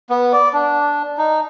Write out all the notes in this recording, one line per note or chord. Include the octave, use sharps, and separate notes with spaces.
B3
D5
D4
D#4